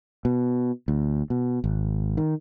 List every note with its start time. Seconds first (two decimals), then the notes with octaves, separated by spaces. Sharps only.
0.25 B2
0.88 D2
1.30 B2
1.64 G#1
2.17 D#3